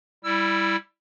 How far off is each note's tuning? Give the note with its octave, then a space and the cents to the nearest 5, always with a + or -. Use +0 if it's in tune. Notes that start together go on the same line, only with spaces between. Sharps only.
G3 +0 E4 +0 E6 +20